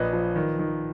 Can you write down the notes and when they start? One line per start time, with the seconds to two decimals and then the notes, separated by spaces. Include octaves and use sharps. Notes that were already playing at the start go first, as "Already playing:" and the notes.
Already playing: A#1 B4 D#5
0.13 F3
0.36 D#3
0.59 D#3